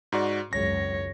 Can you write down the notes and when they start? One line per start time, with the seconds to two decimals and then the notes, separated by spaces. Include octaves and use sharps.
0.12 G#2 F#4 D5
0.53 G#1 C#2 F#2 C#5 A#6